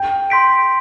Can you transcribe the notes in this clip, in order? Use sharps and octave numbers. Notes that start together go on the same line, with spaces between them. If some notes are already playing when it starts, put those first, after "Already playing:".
Already playing: G5
C6 G6 B6 D7